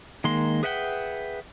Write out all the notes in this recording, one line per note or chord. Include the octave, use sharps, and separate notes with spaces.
D#3 G#3 A#3 C6
G#4 B4 E5 F#5 G5